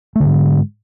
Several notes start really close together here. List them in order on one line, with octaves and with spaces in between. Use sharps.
A3 D3 G#2 G#3